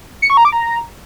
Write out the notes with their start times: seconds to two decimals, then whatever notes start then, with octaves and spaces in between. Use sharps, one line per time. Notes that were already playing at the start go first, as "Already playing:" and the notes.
0.22 C#7
0.30 C#6
0.37 A#5
0.45 D6
0.52 A#5